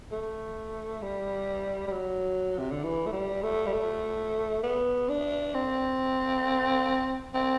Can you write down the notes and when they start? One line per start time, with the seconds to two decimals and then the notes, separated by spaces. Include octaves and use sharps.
0.11 A3
1.02 G3
1.87 G3
1.92 F#3
2.59 C3
2.71 D3
2.83 E3
3.07 A3
3.12 G3
3.43 A3
3.66 G3
3.73 A3
4.63 B3
5.09 D4
5.54 C4
7.34 C4